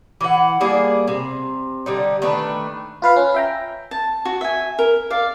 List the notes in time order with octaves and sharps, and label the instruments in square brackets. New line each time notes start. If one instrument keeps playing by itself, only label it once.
[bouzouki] E3 F#5
G3 A#3 G#4 D5
C3
D3 G3 D#4
D#3 A3 D4 B4
[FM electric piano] F4 B4 F5
C#4
E5 G5 A#5
[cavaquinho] A5
F#4
E5 G#5
A#4
D5 F5